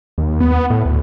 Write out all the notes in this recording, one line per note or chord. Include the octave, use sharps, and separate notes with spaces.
D#2
B3
A2
D2